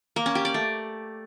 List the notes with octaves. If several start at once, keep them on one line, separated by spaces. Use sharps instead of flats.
A#3
C#4
G4
D5
A3